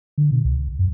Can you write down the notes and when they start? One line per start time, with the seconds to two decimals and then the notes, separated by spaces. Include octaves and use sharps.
0.18 D3
0.32 B2
0.45 C#2
0.79 F#2